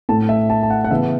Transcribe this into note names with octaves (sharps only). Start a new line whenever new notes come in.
A2 A3 A5
E5
A5
A5
F#5
F#5
C#3 E3 B3 E5